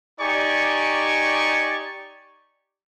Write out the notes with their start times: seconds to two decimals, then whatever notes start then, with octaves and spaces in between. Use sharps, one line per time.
0.20 D#4 G4 D5 G#5 C#6